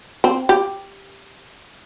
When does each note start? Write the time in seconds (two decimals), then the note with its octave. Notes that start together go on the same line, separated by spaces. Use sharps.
0.24 C4
0.49 G4